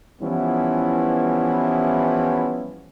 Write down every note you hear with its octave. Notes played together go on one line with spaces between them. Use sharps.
E3 F3 G3 B3 C#4 E4